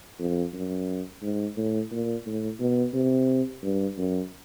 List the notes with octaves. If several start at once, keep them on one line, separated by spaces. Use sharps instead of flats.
F2
F#2
G#2
A2
A#2
A2
B2
C3
G2
F#2